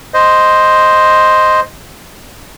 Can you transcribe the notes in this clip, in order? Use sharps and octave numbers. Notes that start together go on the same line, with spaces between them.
C5 D#5